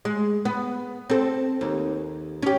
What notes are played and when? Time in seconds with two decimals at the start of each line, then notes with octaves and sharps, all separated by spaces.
0.05 G#3
0.45 B3
1.10 C4 A4
1.61 D#2
2.42 C#4 G4